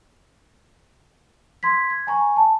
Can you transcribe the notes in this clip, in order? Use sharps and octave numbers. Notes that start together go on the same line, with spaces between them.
C6 G#6 B6
G#6
G#5 A#5 C#6
A5